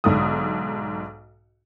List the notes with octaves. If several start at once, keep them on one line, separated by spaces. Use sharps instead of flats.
B1 G#2 D3 D#6